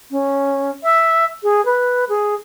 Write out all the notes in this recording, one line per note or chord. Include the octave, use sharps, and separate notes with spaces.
C#4
E5
G#4
B4
G#4